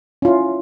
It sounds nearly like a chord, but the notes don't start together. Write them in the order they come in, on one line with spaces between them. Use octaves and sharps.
C#4 F4 E4